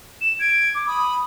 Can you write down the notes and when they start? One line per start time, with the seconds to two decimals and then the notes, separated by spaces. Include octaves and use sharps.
0.21 E7
0.40 G#6 D7
0.75 D6
0.87 B5 D#6